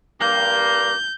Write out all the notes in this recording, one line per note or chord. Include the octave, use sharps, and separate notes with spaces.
G2 A#3 G6